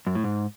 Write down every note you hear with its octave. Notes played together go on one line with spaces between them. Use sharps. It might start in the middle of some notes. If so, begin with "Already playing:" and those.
F#2
A2
G#2